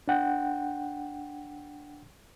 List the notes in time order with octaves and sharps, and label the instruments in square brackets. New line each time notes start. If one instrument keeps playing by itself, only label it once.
[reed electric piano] D4 F#5 G5